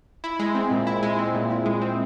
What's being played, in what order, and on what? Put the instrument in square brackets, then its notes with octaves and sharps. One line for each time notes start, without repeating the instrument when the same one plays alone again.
[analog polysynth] E4
G#3
C4
A#2
E4
G#3
C4
A#2
E4
G#3
C4